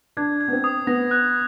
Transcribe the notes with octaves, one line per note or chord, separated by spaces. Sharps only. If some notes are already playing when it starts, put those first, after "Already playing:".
D4 G#6
G#6
B3
C4
D#6
B3 A#6
F#6